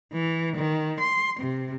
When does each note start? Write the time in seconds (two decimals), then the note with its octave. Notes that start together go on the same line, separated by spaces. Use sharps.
0.12 E3
0.56 D#3
1.00 C6
1.40 C3